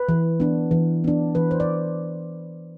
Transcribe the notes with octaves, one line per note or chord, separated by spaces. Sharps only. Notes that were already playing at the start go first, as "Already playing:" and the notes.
Already playing: B4
E3
B3 D4
E3
B3 D4
E3 B4
C5
D5